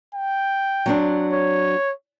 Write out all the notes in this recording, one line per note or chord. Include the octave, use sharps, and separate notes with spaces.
G5
F#3 C4 D4
C#5